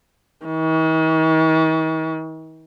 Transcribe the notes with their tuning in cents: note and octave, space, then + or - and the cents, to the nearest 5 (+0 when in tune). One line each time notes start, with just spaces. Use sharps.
D#3 +45